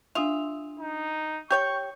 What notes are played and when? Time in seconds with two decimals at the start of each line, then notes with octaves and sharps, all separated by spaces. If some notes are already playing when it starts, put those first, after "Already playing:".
0.15 D4 F4 E5 D#6 F7
0.79 D#4
1.50 G4 C#5 G5 C#6 G6